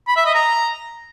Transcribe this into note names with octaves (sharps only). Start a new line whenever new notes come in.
B5
E5
D#5
A#5